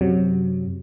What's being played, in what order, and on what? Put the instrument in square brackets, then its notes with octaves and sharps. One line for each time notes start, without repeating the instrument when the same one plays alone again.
[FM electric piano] F#2 C3 F#3